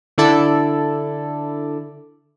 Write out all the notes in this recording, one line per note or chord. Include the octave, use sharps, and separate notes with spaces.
D3 D4 E4 A4 D5